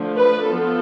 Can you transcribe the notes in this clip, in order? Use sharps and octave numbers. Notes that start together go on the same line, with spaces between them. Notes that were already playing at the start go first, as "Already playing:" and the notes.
Already playing: D3 F3 A3
B4
F3 B3 F4 A4